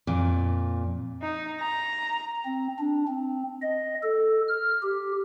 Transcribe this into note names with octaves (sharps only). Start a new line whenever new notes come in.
F2 A#2
D#4
A#5
C4
D4
C4
D#5
A4
F6
G4